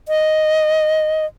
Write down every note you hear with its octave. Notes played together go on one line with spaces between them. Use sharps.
D#5